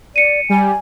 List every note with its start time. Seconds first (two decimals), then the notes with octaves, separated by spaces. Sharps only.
0.16 D5 C#7 D#7
0.49 G3 G#5